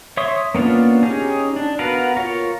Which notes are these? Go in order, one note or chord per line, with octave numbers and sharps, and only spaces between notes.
C#5 E5 C6 C#6 D#6
A#3 B3 C#4 D4 F4
C#4 D#4 G4 G#4
D4
B3 F#4 A#4 B4 F5
F4 A#4 C#5